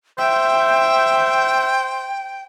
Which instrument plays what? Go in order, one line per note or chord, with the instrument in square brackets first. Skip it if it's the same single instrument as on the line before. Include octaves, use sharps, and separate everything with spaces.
[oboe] C5 [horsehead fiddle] E5 [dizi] G5